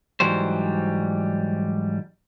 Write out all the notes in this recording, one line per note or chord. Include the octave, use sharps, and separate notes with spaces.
G#2 E3 F#3 G3 C5